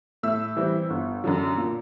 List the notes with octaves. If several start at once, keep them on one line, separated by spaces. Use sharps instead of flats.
A2 E5 E6
E3 G3 C4 E4
G1
F#2 D3 F#3
A#2